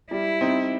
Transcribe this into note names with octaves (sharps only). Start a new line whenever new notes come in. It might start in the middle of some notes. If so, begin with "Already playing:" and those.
G3 E4
C4 D#4